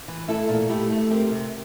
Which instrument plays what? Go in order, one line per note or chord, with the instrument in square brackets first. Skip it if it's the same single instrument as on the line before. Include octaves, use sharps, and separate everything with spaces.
[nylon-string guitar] E3
A3 E4 A4
A#2
A3 E4 G4
A3
C4 G4 A#4
C3